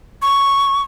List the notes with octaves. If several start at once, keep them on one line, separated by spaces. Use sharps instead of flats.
C#6